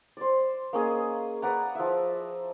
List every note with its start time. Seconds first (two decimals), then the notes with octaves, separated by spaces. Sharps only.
0.17 C5 D5
0.73 A#3 C#4 G#4 D#5
1.42 B4 D5 F#5 A#5
1.75 F3 E5